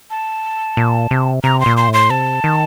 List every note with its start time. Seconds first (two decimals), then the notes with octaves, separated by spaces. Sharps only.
0.10 A5
0.77 A#2
1.11 C3
1.44 C3 A#5
1.60 C6
1.66 A#2
1.77 C6
1.88 A2
1.93 C6
2.10 C3 A5
2.44 D#3